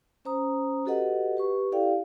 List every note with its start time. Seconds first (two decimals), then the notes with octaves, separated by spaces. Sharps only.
0.25 C#4 C5 A#5 D#6
0.85 F#4 G4 A4 B4 D#5 F#5
1.37 G4 B4 C#6
1.72 E4 G4 A4 D5 F5 G5